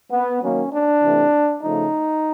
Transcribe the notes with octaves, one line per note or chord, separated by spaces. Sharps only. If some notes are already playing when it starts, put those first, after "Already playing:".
B3
D#3 F#3 A#3 C#4
D4
C3 E3 A3
C#3 F3 A3 D#4